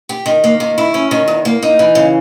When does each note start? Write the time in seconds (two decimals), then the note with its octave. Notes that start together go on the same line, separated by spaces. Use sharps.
0.09 G4
0.26 D#3
0.44 A#3
0.60 D#3
0.78 E4
0.94 C#4
1.11 D#3
1.28 E2
1.45 A#3
1.63 D#4
1.79 E3
1.95 C#3